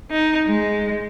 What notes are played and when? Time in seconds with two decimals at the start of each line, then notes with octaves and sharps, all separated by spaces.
0.10 D#4
0.48 G#3